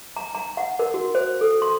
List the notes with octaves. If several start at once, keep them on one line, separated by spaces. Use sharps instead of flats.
A#5
A#5
F#5
A#4
F#4
C5
A4
C6